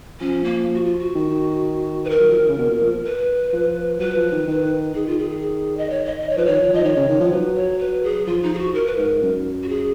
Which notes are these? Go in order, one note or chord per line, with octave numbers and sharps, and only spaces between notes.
F3 C#4
A#3
F#4
F4
F#4
D#3
B4
A#4
F#3
F3
D#3
C#3
B2
A#2
F3
B4
F3
F#3 B4
F3
D#3
D#3
D#3 G#4
F4
G#4
G#4
D#5
C#5
D#5
D#5
C#5
F3 B4
D#3 C#5
F3
F3 D#5
D#3 C#5
C#3
D#3
F3
F#3 B4
C#5
B4
G#4
F3 F4
D#4
G#4
F#4
A#4
B4
G#2 A#4
F#2
F#4
G#4